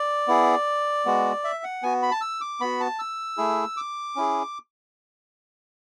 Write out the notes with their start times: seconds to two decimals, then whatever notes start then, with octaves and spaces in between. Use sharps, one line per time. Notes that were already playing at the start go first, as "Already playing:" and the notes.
Already playing: D5
0.28 B3 E4 G#4
1.06 G#3 B3 F#4
1.44 E5
1.64 F#5
1.83 B3 F#4 G#5
2.02 B5
2.11 A5
2.21 E6
2.41 D6
2.60 B3 F#4 B5
2.80 A5
2.99 E6
3.37 A3 E4 G#4
3.77 D6
4.16 C#4 E4 G#4